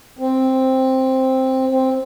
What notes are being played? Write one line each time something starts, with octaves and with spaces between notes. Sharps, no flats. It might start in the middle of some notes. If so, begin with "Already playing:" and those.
C4
C4